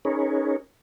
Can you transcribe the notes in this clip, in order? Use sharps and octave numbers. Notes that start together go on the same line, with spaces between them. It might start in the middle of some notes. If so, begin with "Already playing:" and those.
C#4 D#4 G#4 A#4 B4 C#5